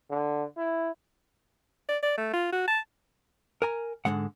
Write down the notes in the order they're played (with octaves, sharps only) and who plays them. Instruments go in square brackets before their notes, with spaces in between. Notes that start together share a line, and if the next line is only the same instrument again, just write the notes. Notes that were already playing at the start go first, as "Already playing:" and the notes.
[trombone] D3
E4
[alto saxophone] D5
D5
A3
F4
F#4
A5
[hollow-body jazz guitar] A#4 G#5 A#5
G#2 D3 G#3 F#5